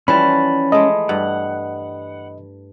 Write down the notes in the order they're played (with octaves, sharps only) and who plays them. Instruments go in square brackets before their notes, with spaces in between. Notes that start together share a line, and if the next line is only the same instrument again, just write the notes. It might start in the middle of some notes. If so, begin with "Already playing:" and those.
[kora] E3 F3 G3 [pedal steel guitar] C#4 A5 [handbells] B5
[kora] G#3 A3 [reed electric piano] D#5
[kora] G2 [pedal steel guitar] F#5